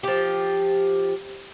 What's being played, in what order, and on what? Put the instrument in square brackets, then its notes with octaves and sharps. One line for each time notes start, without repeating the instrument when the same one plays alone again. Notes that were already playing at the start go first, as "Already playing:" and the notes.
[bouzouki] F3 G4